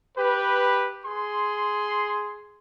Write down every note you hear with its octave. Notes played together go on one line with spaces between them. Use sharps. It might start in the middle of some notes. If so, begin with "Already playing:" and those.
G4 B4
G#4 C6